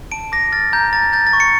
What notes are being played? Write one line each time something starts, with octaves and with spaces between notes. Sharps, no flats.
A5 D7
D6 A#6
F6 A6
A#5 G6
A#5 A6
G6 A6
A6
C#6
C#7